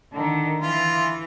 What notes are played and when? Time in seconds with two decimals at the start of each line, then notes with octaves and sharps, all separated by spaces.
0.13 D3 D#3
0.60 E3 F4